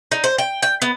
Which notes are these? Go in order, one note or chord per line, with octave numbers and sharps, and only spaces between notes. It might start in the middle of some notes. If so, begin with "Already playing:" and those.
D#4
C5
G5
G5
B3